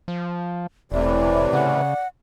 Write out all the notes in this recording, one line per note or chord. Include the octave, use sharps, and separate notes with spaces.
F3
E1 A2 C3 E3 D5
C#3 F#5